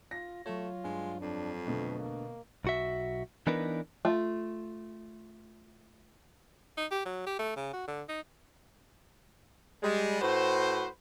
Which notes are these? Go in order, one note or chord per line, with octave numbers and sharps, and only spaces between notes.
F4 A#6
F#3 A3 F4 C#5
G2 G#3
F2 D4
B2 D3 A3 B4
A#3
B1 F#4 E5
E3 B3 D4 D#4 A#4 B4
A3 F4
D#4
G4
F#3
G4
A3
C#3
F#4
D3
D#4
G3 G#3
A2 F#4 B4 C5